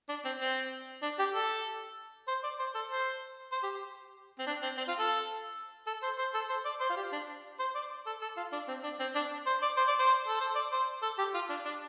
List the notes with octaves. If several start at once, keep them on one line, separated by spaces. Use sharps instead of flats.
D4
C4
C4
D4
G4
A4
C5
D5
C5
A4
C5
C5
G4
C4
D4
C4
C4
F4
A4
A4
C5
C5
A4
C5
D5
C5
F4
G4
D4
C5
D5
A4
A4
F4
D4
C4
D4
C4
D4
C5
D5
C5
D5
C5
A4
C5
D5
C5
A4
G4
F4
D4
D4